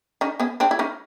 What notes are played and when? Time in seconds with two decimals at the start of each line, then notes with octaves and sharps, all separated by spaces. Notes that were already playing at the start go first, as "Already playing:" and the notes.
0.21 C#4 D#4
0.40 B3 C#4
0.60 C4 D4
0.71 E4
0.79 C#4 D#4